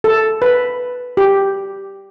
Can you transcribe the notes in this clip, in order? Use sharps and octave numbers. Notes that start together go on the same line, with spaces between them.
A4
B4
G4